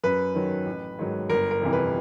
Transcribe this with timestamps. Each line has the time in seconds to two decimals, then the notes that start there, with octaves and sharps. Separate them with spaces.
0.04 F#2 B4
0.34 D#3 F#3
0.66 A1
0.99 G#2 D#3 F#3
1.30 G1 A#4
1.51 A#4
1.62 F2 C3 E3
1.73 B4